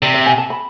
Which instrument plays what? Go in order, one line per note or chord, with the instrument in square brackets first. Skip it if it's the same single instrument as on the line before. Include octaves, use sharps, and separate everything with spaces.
[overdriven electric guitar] C3 [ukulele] D5
[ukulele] E5
G#5
A5
B5